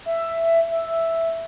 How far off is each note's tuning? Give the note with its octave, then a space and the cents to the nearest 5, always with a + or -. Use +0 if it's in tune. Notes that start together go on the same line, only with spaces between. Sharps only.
E5 +10
E5 +0